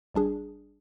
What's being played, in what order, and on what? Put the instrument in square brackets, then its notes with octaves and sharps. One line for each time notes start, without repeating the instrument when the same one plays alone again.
[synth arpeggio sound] G#1 G3 D4 G#4